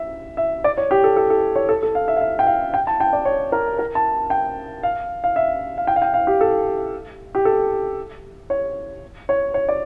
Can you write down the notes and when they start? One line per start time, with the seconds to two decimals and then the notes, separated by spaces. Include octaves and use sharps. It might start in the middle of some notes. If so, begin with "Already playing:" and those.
Already playing: E5
0.37 E5
0.64 D5
0.77 C#5
0.91 G4
1.04 A4
1.17 A4
1.30 A4
1.56 C#5
1.69 A4
1.82 A4
1.95 F5
2.08 E5
2.17 F5
2.21 E5
2.39 G5
2.47 F5
2.74 G5
2.87 A5
3.00 G5
3.13 D5
3.25 C#5
3.52 A#4
3.79 A#4
3.95 A5
4.30 G5
4.83 F5
5.24 F5
5.36 E5
5.78 F5
5.87 G5
5.96 F5
6.02 G5
6.14 F5
6.27 G4
6.41 A4
7.35 G4
7.45 A4
8.50 C#5
9.29 C#5
9.54 C#5
9.69 D5